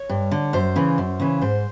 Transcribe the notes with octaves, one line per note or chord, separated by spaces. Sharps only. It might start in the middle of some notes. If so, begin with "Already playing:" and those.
Already playing: C#5
G2
D3
F#2 C5
C#3 E3
F#2
C#3 E3
G#2 C5